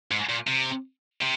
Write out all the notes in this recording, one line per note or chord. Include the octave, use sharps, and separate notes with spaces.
G#2
A#2
C3
C3